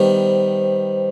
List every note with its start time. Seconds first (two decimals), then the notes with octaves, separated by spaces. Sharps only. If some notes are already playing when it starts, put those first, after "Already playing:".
Already playing: D#3 G3 B3 C5